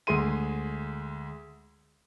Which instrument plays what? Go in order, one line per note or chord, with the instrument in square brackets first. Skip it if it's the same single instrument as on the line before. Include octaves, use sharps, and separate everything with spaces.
[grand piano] D2 G#3 G#4 C6 D#7